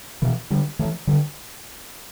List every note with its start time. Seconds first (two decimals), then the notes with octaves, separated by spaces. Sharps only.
0.22 B2 E3
0.50 D3 G3
0.79 E3 A3
1.07 D3 G3